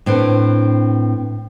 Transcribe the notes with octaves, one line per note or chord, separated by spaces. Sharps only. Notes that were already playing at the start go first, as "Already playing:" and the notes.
A2 C4 D4 B4 C5